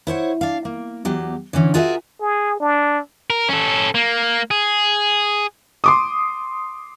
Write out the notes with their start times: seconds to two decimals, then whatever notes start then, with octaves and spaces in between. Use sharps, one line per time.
0.07 E4 C5 C#5 F#5
0.41 D4 F5
0.65 A#3
1.05 E2 F#3 G4
1.53 D3 E3 C#4
1.74 F4 F#4 G#4 A#4 D#5 E5
2.20 G#4
2.60 D4
3.30 A#4
3.49 C#4 A4
3.95 A#3
4.51 G#4
5.84 C6 D6 D#6